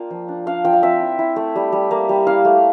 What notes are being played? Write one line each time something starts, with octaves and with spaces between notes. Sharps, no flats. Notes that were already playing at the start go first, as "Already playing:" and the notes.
Already playing: A#3 D4 F4 G5
F3
D4
D4 F5
F3 G5
F5
C4 E5
E4
E4
A3
G3
G3
A#3
G3
E4 F5
A3